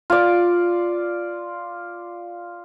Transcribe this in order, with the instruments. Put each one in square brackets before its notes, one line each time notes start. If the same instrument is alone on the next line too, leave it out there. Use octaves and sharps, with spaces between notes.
[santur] F4 D5